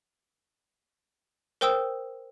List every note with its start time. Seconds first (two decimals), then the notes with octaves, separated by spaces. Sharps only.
1.61 A#4 C5 G5 D#6 E6